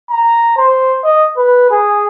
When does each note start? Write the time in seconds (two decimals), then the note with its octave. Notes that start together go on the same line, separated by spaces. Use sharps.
0.11 A#5
0.57 C5
1.04 D#5
1.37 B4
1.71 G#4